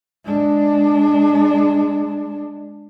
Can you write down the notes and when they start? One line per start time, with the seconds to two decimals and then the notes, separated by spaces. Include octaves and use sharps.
0.25 G#3 D4